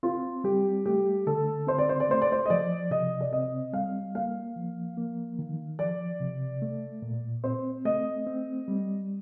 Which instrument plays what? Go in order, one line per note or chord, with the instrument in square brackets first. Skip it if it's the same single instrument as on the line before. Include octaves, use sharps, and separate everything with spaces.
[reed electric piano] C4 [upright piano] F4
[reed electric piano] G3 [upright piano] G4
[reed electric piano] A3 [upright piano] G4
[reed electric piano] D3 [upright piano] A4
[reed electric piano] C4 [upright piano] C5
[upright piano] D5
C5
D5
[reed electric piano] A3 [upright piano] C5
[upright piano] D5
C5
D#5
[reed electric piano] F3 [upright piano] D5
[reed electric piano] C3 [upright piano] D#5
[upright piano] D5
[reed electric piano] C4 [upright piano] D#5
[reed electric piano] G3 [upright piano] F5
[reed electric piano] A#3 [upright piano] F5
[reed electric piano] F3
A#3
D#3
[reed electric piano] F3 [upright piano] D5
[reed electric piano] C3
A3
A#2
[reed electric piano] C4 [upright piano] C5
[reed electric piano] A3 [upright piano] D#5
[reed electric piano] C4
G3